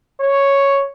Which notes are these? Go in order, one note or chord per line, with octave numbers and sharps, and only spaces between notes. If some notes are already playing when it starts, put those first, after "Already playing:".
C#5